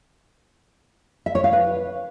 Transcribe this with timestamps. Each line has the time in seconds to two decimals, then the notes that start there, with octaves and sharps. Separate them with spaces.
1.26 E5
1.35 C#5
1.44 F5
1.53 B4